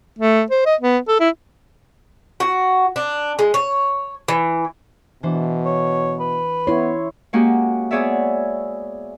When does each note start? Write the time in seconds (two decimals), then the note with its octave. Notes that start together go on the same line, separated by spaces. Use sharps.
0.19 A3
0.51 C5
0.66 D#5
0.81 B3
1.08 A4
1.20 E4
2.40 F#4
2.96 D4
3.39 G#3
3.54 C#5
4.28 E3
5.23 B2 E3 D4 C5
5.65 C#5
6.20 B4
6.67 B3 E4 C#5 C6
7.33 G#3 A#3 C#4 F#4 G4
7.91 B3 G#4 C#5 D5 E5